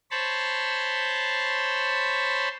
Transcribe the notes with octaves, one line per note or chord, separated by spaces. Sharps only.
C5 C#5 A5 B5